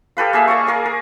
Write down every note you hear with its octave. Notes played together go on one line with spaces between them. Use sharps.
G4 A4 B4 F5
A#3 G#4 E5
D5 D#5 F5 C#6
G#4 A#4 D5
A#4